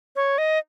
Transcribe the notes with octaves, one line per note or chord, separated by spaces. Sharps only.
C#5
D#5